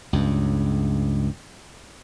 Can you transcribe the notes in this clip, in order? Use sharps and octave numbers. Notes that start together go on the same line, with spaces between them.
C#2 G2